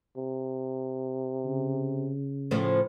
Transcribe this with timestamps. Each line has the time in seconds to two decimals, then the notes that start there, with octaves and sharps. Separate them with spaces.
0.17 C3
1.45 C#3
2.51 A2 F3 C#4